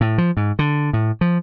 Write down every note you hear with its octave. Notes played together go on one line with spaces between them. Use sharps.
A2
F3
G#2
D3
A2
F3